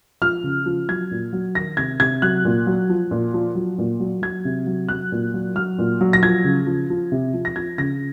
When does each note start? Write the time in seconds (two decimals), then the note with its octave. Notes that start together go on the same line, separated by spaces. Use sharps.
0.21 F3 F6
0.44 C#3
0.66 F3
0.88 F#3 G#6
1.11 A#2
1.33 F#3
1.55 D#3 A#6
1.77 C3 G#6
2.00 C3 G#6
2.22 F#3 F#6
2.45 A#2
2.67 F#3
2.89 F3
3.11 A#2
3.34 F3
3.55 F#3
3.78 A#2
4.00 F#3
4.22 F#3 G#6
4.45 C3
4.66 F#3
4.89 F#3 F#6
5.12 A#2
5.34 F#3
5.56 F#3 F6
5.79 A#2
6.01 F#3
6.13 A#6
6.22 F3 G#6
6.44 C#3
6.67 F3
6.90 F3
7.12 C3
7.34 F3
7.45 A#6
7.56 F3 G#6
7.78 C#3 A#6